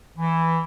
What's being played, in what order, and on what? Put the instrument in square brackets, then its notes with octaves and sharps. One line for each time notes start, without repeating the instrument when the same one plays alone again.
[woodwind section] E3